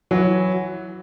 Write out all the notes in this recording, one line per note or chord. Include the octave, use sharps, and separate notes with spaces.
E3 F#3